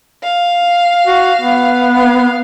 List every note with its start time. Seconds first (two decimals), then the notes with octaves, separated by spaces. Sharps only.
0.23 F5
1.07 F#4
1.42 B3
1.93 F5